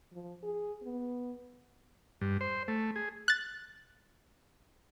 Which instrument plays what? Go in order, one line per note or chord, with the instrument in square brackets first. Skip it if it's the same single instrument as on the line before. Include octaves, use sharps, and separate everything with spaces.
[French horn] F3
G#4
B3
[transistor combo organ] G2
C5
A3
G#4
[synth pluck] F#6 A6